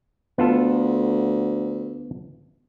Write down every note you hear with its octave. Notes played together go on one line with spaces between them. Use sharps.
D2 B3 F4 A4